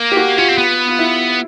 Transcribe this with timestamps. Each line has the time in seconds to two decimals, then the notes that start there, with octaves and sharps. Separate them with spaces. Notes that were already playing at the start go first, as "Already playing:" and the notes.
Already playing: A#3
0.12 G4
0.17 F#4
0.38 C#4 F4
0.48 C4
0.58 B3
0.88 F4
0.99 E4